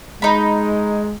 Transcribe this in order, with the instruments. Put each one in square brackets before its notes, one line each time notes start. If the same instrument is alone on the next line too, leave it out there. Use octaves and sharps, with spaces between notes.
[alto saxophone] G#3 [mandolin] D#4 B5